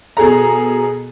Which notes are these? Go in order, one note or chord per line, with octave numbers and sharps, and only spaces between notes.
B2 G#4 A4 A#5